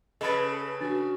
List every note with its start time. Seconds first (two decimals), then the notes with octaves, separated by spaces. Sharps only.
0.21 C#3 A4 B4 D#5 B5 A6
0.81 D4 F#4 A6